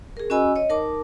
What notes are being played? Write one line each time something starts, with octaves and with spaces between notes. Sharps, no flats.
G#4 A#4
C#4 F#4 D#5 G#5 B5 E6
C#5 D#5
D#4 A#4 A5 D6